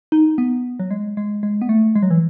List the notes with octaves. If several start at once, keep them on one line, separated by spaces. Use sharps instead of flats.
D#4
B3
F#3
G#3
G#3
G#3
B3
A3
G#3
F#3
E3